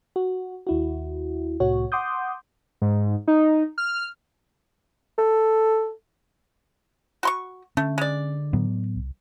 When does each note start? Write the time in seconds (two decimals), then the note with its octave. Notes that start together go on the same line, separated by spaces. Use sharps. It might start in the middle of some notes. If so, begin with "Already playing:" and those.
0.16 F#4
0.67 D#2 E4 F#4
1.60 C2 A2 F#4 C#5
1.92 F#5 C6 D6 D#6 G6
2.82 G#2
3.28 D#4
3.78 F6
5.18 A4
7.23 F#4 C6 C#6
7.77 D3 A3 C#4
7.98 G#3 D5
8.53 A2 F#3 B3
8.96 C2